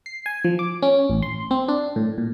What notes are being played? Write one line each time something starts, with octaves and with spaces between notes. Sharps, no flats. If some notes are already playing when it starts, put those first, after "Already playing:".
C7
G#5
F3
D6
C#4
A1
C6
C4
D4
A2
A#2